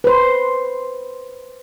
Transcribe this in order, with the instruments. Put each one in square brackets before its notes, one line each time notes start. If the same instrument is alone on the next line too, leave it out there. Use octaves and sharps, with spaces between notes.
[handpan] B4 C5